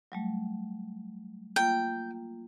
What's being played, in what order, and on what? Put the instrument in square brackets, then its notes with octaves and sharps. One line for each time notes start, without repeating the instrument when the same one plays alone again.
[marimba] F#3 G3 A3
[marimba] A#3 F4 [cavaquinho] G5